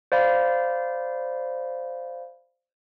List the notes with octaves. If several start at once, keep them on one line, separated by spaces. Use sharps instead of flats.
C5 D5 F5 B5